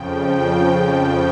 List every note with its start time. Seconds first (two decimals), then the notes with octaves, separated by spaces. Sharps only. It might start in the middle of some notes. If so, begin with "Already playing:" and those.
Already playing: F2 C#3 F3 G5
0.37 G5
0.72 G5